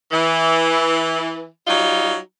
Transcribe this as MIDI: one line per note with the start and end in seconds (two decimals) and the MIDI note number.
0.12 1.46 52
1.67 2.17 54
1.67 2.17 55
1.67 2.17 63
1.67 2.17 65